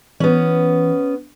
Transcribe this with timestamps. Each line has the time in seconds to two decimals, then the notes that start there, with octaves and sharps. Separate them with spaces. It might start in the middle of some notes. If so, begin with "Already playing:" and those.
0.20 E3 B3 C#4